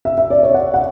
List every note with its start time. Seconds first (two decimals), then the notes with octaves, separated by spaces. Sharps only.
0.05 E5
0.18 E5
0.30 D5
0.43 C#5
0.54 F#5
0.74 F#5